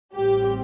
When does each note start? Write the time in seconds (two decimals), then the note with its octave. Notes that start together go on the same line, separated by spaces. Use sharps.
0.14 A1 A2 G3 C4 G4